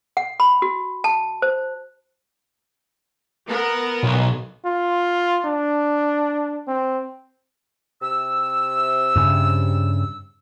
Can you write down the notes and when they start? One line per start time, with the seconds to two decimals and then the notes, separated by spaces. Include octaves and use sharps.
0.17 F#5
0.40 B5
0.62 F#4
1.04 A5
1.42 C5
3.48 B3 A#4
4.03 B1
4.65 F4
5.45 D4
6.68 C4
8.02 C3 E6
9.16 G2 C#3